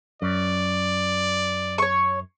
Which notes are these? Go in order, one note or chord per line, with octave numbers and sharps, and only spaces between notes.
F#2 D5
C#5 C#6